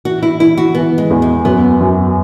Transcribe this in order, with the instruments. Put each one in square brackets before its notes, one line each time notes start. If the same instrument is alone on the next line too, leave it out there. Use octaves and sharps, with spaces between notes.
[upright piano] E3 [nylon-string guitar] F#4
[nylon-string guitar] E4
[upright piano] E3 [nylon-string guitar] E4
[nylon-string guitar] F#4
[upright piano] E3 [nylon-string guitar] B3
[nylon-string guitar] G#3
[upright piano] E2
[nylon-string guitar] G#3
[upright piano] F#2 [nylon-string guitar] B3
[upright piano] F#2